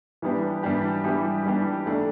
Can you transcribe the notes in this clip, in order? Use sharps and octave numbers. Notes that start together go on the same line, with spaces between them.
E3 G3 B3 D4 G4
E3 G3 B3 D4 G4
E3 G3 B3 D4 G4
E3 G3 B3 D4 G4
A3 D4 A4 D5